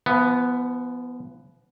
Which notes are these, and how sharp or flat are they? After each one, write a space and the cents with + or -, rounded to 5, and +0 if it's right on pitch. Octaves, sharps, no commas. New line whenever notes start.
F3 -40 B3 +0